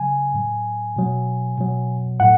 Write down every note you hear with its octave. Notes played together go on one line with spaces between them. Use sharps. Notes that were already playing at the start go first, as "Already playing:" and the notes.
Already playing: C#3 F#3 G#5
A2 F#3
B2 F#3
B2 F#3
A2 F#5